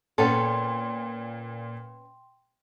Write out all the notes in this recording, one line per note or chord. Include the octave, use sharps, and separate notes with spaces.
A#2 B3 C#4 A4 G5 C6